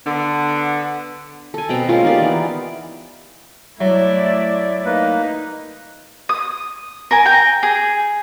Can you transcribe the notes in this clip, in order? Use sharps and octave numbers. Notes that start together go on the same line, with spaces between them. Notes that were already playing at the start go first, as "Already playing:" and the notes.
D3 B3
A4 G#5
B2 C4 G5 A#5
G#3 A#3 C#4 F4
D#4 G4 A#4 D5
E3 B3
F#3 A3 E4 D5 E5
A#3 D#4 B4
D#6
A#4 G#5
G5 A#5
G#4